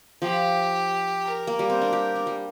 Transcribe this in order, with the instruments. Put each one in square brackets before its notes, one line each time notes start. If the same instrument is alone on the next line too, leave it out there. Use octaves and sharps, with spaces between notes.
[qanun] F3 [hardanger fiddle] G4
[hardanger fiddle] A#4
[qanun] A#3
G3
C4
D4
G4
D4
G3